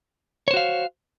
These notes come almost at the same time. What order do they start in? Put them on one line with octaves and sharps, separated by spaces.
C#5 C5 F#4 F5